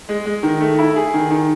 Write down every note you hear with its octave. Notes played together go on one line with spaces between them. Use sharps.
G#3
G#3
D#3
A3
E4
G#4
D#3
D#3